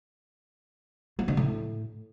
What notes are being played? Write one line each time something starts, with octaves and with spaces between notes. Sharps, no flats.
F#3
D3
A2